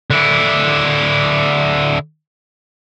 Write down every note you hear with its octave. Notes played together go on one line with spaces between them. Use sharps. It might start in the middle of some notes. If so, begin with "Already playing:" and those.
D3 E4